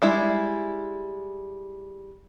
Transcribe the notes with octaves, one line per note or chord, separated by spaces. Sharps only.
G3 G#3 E4